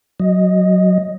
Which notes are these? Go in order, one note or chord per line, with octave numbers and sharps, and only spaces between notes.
F#3 D#5